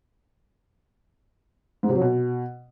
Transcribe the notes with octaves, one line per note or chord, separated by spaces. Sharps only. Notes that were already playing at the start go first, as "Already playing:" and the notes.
G#2
C3
F#3
B2